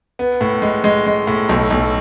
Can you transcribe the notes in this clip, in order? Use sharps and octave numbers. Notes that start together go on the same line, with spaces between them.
B3
A2
G#3
G#3
G#3
A2
B1
B1